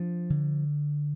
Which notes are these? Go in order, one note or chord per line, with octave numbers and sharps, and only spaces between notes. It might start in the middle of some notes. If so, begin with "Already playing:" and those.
Already playing: F3 D4
D3